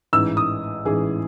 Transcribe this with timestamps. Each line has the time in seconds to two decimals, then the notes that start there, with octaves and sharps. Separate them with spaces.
0.13 A1 G#2 E3 E6
0.37 D#6
0.85 A1 G#2 E3 G#4